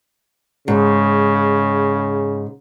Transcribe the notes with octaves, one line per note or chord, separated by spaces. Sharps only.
G#2 C#3